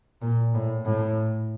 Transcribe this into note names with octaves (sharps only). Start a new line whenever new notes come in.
A#2
A2
A2